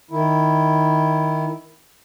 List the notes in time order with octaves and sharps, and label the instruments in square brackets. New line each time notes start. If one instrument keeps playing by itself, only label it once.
[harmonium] D#3 E4